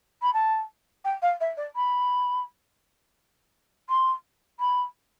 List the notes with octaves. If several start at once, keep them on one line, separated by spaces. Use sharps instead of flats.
B5
A5
G5
F5
E5
D5
B5
C6
B5